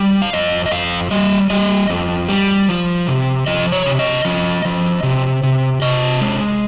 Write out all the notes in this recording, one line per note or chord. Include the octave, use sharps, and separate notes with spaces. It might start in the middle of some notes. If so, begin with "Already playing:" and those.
Already playing: G3
F5
F2 D#5
D#5
F2 F5
G3 D#5
G3 D#5
F2
G3
F3
C3
F3 D#5
C#5
C3
D#5
F3
F3
C3
C3
C3 D#5
G#3